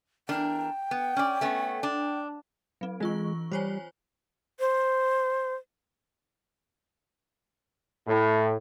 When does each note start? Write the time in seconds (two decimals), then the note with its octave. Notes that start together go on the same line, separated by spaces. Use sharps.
0.29 E2 D4 A#4 G5
0.91 B3
1.16 C#4 D5
1.41 A3 B3 C#4
1.83 D4
2.81 F#3 C4
3.00 E3 G#3 F4 C#6
3.51 G3 C5 C#5 G#5
4.60 C5
8.07 A2